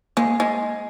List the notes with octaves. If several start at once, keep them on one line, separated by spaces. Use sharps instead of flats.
G#3 A#3
G#3